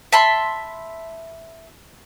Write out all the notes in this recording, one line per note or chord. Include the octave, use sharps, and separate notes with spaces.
E5 A5 B5 C6